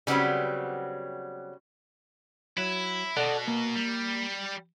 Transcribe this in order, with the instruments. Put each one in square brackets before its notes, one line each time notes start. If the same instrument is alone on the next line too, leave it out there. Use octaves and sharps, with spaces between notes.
[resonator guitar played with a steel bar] C#3 F#3 G3 B3 C4
[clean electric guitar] F#3 [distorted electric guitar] E4
[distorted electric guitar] B2 [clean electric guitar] A4 D5 F#5
[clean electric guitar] A#3
[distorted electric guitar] G3